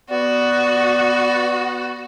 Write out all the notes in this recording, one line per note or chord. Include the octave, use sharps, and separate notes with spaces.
B3 F#4 D5